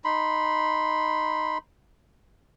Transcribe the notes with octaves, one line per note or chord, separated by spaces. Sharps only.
D#4 B5 C6